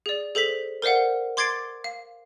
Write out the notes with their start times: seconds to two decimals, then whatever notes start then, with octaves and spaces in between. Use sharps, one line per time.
0.06 G#4 D5
0.35 G#4 A4 C5 B6
0.82 A#4 C5 D5 F5 F#5
1.37 C6 D6 G#6 A6 C7 D7
1.84 F5